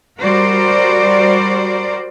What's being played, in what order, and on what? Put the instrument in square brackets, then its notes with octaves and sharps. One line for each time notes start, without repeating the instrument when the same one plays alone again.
[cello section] G3 F#4 A#4 C5 D5